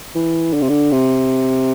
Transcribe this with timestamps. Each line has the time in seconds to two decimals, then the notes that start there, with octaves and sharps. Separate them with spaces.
0.15 E3
0.53 D3
0.62 C3
0.69 D3
0.92 C3